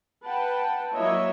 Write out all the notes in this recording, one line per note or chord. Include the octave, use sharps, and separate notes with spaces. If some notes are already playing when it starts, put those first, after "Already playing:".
B4 F#5 G5 A5
F#3 A#3 E4 C#5 D#5 E5